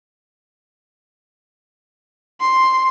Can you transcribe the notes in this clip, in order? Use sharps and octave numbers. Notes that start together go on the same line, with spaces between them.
C6